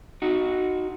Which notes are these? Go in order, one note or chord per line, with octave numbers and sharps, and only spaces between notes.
D#4 F#4